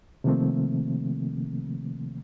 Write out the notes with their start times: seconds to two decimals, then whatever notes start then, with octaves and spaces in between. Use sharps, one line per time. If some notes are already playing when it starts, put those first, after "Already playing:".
0.24 C3 D#3 F3 A3 A#3 C4